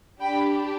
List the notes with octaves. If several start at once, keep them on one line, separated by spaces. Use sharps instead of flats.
D4 G4 G5 B5